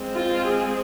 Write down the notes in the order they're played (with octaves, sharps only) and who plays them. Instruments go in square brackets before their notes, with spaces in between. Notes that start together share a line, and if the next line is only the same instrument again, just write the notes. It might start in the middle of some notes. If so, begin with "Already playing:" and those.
Already playing: [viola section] G#3 C4
F4
G#4